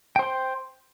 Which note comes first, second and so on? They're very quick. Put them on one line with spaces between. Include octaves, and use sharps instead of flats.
G5 C5 C6